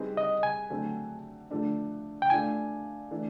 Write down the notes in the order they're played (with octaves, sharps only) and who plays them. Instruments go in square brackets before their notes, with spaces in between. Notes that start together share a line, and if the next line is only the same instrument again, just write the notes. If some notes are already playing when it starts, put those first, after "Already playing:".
Already playing: [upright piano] G3 C4 D#4 G#4 B4
[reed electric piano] D#5
G#5
[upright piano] D3 F#3 A3 C4
D3 F3 A3 D4
[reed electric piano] G5
[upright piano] A3 D4 F4 [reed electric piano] G#5
[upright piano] E3 A3 D4